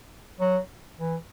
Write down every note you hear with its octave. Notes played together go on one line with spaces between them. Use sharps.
F#3
E3